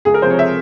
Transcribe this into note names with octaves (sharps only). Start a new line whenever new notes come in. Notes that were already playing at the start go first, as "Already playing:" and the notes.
C#2 G#4
A#4
C3 F3 C5
C#5
E5